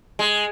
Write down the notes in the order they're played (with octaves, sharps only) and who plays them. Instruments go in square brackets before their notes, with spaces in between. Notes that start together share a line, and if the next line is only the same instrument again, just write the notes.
[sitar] G#3